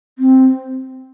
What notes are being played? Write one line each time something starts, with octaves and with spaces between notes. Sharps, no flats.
C4